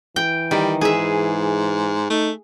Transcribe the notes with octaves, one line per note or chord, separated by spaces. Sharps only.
E3 G5
D#3 G3
G#2 G#4 E5
A3 D#4